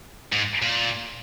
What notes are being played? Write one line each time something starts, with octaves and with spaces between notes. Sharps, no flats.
G#2
A#2